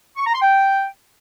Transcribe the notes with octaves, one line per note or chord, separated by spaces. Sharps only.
C#6
A#5
C6
G5